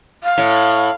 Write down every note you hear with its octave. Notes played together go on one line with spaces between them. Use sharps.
F5
A2